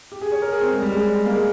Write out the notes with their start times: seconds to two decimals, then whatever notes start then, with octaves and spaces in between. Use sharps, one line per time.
0.12 G4
0.21 G#4
0.32 C#5
0.42 A#4
0.52 G#4
0.61 C4
0.71 G#3
0.82 G3
0.92 G#3
1.26 A#3
1.32 G#3